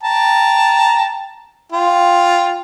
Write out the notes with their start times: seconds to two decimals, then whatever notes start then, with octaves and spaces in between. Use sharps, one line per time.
0.03 G5 A5 A#5
1.72 F4 G5